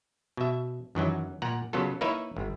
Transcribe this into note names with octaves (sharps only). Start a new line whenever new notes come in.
B2 E5
F#2 D#3 E3 F#3
A#2 F#5 A#5
C#3 F#3 B3 F4 A4
A#3 D#4 E4 B4 C#5 E5
G1